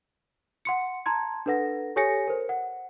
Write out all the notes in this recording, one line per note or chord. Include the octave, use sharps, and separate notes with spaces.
F#5 C6 C#7
A5 A#5 C6 G#6
D4 A4 B4 F#5 A#6
G4 A4 C#5 G#5 A#6 C#7
A#4 C5
F#5